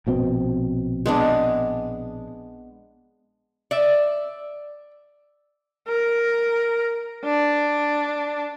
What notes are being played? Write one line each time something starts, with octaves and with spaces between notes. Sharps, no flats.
A#1 B2 C4
G#3 B3 D4
D5 E5
A#4
D4